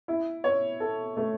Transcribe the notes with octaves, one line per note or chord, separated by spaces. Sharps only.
E4
C#5
A4
A3